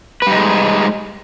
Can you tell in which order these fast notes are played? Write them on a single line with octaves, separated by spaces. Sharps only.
B4 G3 D#4 G#3